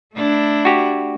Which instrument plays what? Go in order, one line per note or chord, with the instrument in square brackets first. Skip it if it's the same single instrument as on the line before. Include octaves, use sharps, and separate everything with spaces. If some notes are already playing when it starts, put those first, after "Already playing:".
[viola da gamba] A3 D4 E4
[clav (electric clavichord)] F#4 G4